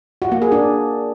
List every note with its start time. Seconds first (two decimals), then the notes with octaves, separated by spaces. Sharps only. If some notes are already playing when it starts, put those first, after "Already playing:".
0.22 F#4
0.32 A#3
0.42 G#4
0.52 D4